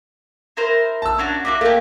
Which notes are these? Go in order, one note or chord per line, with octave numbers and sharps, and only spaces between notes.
E4 A#4 C5
A5 E6
C#4 D4 F#4
A#3 F#4 E5 D6
A3 A#3 G4